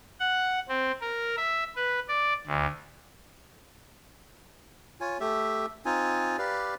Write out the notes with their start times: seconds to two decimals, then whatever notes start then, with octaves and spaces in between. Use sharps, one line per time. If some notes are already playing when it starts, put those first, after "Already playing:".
0.20 F#5
0.69 C4
1.01 A#4
1.37 E5
1.76 B4
2.08 D5
2.46 D2
5.01 F4 C#5 G#5
5.20 A3 G4 E5
5.85 C4 D#4 F4 G#5
6.38 G4 B4 D5 F5